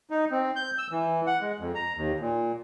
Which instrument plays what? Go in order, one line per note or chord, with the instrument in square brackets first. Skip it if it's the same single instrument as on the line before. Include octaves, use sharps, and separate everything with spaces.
[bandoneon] D#4
C4
G6
E6
E3
F#5
G#3
F2
A#5
D#2
A#2